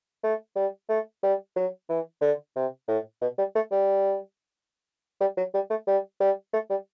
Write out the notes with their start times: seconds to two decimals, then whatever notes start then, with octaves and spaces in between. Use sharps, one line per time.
0.24 A3
0.56 G3
0.89 A3
1.23 G3
1.56 F#3
1.89 E3
2.21 D3
2.56 C3
2.88 A2
3.21 B2
3.38 G3
3.55 A3
3.71 G3
5.20 G3
5.37 F#3
5.54 G3
5.70 A3
5.87 G3
6.20 G3
6.53 A3
6.70 G3